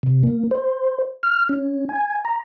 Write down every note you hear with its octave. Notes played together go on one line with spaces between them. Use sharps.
C3
A#3
C5
F6
C#4
G#5
A#5